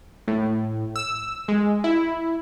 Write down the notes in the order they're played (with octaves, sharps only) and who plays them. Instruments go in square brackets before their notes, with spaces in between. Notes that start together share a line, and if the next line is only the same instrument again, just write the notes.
[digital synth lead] A2
E6
G#3
E4